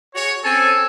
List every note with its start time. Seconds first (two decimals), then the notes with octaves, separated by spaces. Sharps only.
0.14 F#4 G#4 C#5
0.44 C4 C#4 A4 G#5